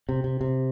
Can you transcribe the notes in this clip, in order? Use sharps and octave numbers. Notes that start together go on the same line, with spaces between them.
C3
C3
C3